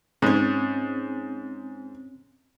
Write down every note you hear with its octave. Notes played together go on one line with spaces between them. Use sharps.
G#2 C4 C#4 C#5